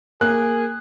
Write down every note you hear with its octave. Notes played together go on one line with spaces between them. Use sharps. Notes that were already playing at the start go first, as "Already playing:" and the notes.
A#3 G#4 F#6